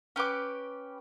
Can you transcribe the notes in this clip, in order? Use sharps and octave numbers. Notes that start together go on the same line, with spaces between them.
C#4 G4 B4 D6